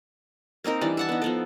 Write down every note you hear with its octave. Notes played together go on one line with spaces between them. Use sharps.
A#3 C4 D#4 A#4
E3 G3 D4 B4
E5 F#5 A5
B3 D#4
F3 B3 A4